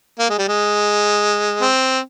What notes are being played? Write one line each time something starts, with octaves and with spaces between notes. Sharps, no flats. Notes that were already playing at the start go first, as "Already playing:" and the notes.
A#3
G#3
G3
G#3
C4